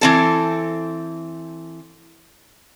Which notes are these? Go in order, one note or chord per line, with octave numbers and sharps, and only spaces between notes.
E3 C4 A4